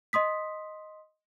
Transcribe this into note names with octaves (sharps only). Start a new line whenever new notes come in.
D#5 C6 D#6 B6